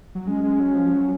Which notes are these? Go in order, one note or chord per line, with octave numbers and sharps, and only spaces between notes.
F#3
G#3 C#4
G#3
F#3
F3
F#3